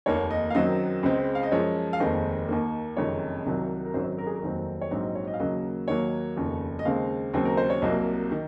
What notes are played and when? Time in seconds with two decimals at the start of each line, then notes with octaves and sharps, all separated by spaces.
0.06 F1 D#2 D#3 A#3 C#5
0.31 D#5
0.50 F5
0.54 F#2 D#3 F#3 C4 D#5
1.03 C#2 C#3 G#3 C4
1.35 F5
1.43 D#5
1.52 F#2 F3 G#3 C#5
1.93 F5
2.00 F1 D#2 D#3 G#3 C4 D#5
2.49 D#2 D#3 A#3
2.97 F#1 F2 C3 D#3 G#3 C#5
3.46 C2 C3 D#3 F#3
3.86 A#4
3.94 G#1 F#2 D#3 F#3 C5
4.18 A#4
4.26 G#4
4.35 A#4
4.42 F1 D#2 D#3 F#3 C4
4.81 C#5
4.91 A#1 G#2 F#3 C4 D#5
5.03 D#5
5.15 C#5
5.27 D#5
5.34 F5
5.39 D#2 C#3 F#3 A#3 D#5
5.88 D#2 D#3 F#3 A#3 C#5
6.36 F1 D#2 C#3 F3
6.79 D#5
6.85 D#2 C#3 G#3 C4 F5
7.34 D#2 C#3 F#3 C4
7.45 A#4
7.57 C5
7.70 C#5
7.82 C2 C3 F#3 A#3 D#5
8.31 D#3